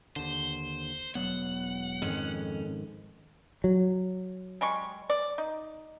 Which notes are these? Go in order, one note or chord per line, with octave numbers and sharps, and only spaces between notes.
D#2 D3 C5
E1 F#3 B3 F#5
F2 G#2 D#3 C#4
F#3
G3 G#3 C#6
D5
D#4